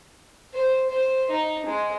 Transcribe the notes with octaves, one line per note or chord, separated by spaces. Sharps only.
C5
C5
D#4
G#3